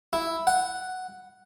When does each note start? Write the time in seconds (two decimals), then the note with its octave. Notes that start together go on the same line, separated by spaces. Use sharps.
0.13 E4
0.47 F#5